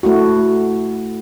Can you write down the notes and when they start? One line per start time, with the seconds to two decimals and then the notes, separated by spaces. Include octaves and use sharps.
0.03 A3 E4 F#4